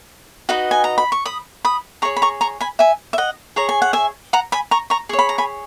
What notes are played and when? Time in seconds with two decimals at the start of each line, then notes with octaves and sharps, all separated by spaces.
0.49 D#4 F#4 B4 D#5
0.71 G#5
0.84 A#5
0.98 B5
1.12 C#6
1.25 B5 D#6
1.65 B5 D#6
2.02 G#4 C#5 A#5 C#6
2.17 B5
2.22 A#5 C#6
2.41 A#5 C#6
2.61 G#5 B5
2.79 E5 G#5
3.13 E5
3.18 D#5 F#5
3.56 G#4 C#5 A#5
3.69 G#5
3.82 F#5
3.93 E5 G#5
4.33 F#5 A#5
4.52 G#5 B5
4.71 A#5 C#6
4.90 A#5 C#6
5.09 G#4 C#6
5.13 C#5
5.19 B5
5.29 A#5
5.38 G#5 B5